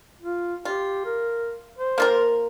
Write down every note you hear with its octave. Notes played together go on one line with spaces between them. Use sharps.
F4
F4 G4
A#4
C5
A#3 F4 A#4